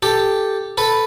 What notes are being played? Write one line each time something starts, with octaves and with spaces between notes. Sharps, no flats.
G4 A4
A4 B4